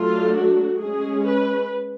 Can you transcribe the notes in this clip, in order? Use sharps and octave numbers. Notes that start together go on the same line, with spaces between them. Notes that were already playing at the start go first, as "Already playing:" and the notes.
Already playing: F#3 A3 D4 F4
F#4
G#3 C#4 G#4
B4